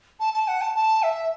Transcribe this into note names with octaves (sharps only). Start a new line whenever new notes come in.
A5
A5
F#5
A5
A5
E5